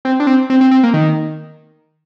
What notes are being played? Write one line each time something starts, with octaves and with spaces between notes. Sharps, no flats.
C4
D4
C4
C4
C4
C4
A#3
D#3